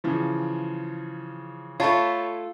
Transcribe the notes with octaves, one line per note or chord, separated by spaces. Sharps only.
C#3 E3 F3
A3 F4 C#5 A5 B5